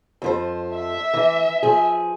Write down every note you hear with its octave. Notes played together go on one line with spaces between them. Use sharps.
F2 F3 C5
E5
E3
F3 G#4